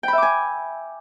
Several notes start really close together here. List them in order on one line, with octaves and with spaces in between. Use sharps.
G5 B5 E5 D6 G#5